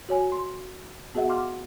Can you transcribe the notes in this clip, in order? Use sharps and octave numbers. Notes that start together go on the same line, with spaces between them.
F#4 C#5 G#5
C6
B3 F#4 G#4 D#5 E5 F#5
F5 F#5 C6 D6 F6